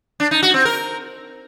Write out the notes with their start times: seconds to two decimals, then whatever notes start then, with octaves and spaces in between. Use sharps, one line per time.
0.20 D4
0.31 D#4
0.43 F#4
0.54 C4
0.65 A#4